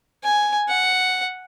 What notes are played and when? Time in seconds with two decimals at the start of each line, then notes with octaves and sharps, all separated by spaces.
0.23 G#5
0.68 F#5